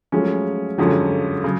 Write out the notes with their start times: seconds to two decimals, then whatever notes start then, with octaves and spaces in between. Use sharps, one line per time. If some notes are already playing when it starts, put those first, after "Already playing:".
0.12 F3 F#3 G#3 A3 C#4
0.78 F2 D3 F3 F#3 G#3 C#4
1.44 C#3 F#3